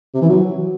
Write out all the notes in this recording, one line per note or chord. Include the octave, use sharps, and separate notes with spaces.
C3
E3
F#3